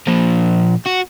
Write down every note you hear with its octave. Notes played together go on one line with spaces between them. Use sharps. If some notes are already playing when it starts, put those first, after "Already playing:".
A#2 F3
F#4